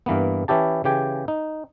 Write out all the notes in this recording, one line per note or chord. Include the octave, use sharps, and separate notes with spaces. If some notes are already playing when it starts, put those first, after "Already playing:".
G2 E3 A#3 B3
E3 C#4 E4 G4 A5
C#3 E3 G4 G5 G#5
D#4